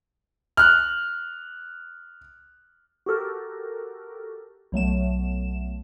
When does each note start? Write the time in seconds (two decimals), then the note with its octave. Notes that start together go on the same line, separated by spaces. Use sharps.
0.57 F6 F#6
3.06 F#4 G4 A4 A#4
4.72 B1 F#3 A3 E7